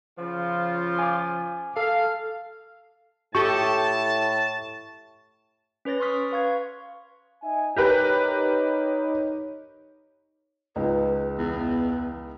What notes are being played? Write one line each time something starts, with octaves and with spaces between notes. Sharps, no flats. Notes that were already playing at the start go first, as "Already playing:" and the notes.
C#3 F3 F4
G#5 D6
A4 F5
A2 G4 A4 D#5 A5 C#6
C#4 B4 C#5 A6 A#6
C6 C#6 D#6 F6 B6
B4 F5 C#6 G#6
D#4 E5 G#5
D#4 G4 A#4 B4 C#5
C#2 G#3 D#4 B4
E2 B3